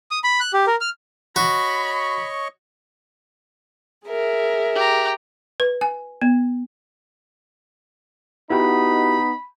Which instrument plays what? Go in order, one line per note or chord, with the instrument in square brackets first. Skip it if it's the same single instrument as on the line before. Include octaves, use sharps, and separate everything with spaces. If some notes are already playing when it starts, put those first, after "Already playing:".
[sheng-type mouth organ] D#6
B5
F#6
G4
A#4
F6
[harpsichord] F#4 [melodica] C#5 D#5 C#6 [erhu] B5
[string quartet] G#4 A#4 E5
[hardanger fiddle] G4 A#5
[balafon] B4
G#5
B3
[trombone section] B3 D#4 [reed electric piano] E4 F#4 G4 [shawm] B5